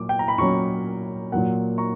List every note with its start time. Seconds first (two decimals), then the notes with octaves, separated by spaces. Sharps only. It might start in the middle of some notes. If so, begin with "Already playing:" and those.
Already playing: A#2 F#3 D6
0.09 G5
0.19 A#5
0.28 B5
0.38 A#2 F#3 C#4 A#5 C#6
1.32 A#2 F#3 A#3 F#5
1.78 A#5 C#6